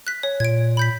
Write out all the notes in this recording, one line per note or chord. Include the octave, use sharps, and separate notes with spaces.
F#6 B6
C#5
A#2 G#6 D7
B5 G6 B6